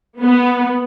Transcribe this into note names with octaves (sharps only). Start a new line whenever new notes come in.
B3